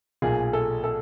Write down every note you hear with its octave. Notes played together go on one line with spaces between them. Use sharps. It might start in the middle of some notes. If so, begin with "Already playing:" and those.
B1 A#2 G#4
A4
A4